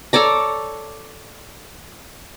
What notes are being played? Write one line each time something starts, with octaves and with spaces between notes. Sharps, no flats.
A4 C#5 D5 A#5